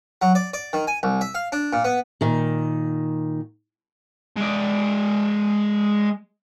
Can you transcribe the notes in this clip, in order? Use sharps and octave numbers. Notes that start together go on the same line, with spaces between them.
F#3
D5
D5
D#3
G#5
C2
E5
F5
D4
A#2
B3
A#2 D#3
G#3 D5